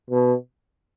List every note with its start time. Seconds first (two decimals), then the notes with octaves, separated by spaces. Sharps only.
0.10 B2